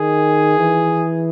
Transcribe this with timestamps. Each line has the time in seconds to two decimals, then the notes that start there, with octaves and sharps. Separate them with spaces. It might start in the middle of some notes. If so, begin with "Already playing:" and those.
Already playing: D#3 G#4
0.57 E3